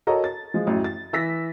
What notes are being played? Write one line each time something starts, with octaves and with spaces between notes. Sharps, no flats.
F#4 A4 A#4 C#5 D#5 A#5
A6
F3 G#3
A1 F#2
A6
E3 E6 A#6 B6